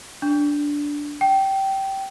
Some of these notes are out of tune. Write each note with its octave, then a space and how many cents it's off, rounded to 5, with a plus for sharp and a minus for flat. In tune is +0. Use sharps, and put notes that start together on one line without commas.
D4 -10
G5 -15